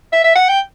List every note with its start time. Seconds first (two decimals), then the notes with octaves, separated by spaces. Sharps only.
0.12 E5
0.24 E5
0.36 F#5
0.49 G5